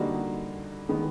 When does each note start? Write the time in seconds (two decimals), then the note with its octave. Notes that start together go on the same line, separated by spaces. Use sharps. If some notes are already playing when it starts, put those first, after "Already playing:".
Already playing: D3 G3 A#3 D#4 F#4
0.89 D#3 G#3 B3